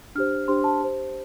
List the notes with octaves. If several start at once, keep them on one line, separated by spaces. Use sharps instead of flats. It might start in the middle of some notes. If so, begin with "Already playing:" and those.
D4 G4 C5 F6
D4 G4 C5 C6
A5
G4 C5